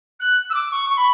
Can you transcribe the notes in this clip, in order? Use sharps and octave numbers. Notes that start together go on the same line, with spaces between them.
F#6
E6
D6
C#6
C#6
B5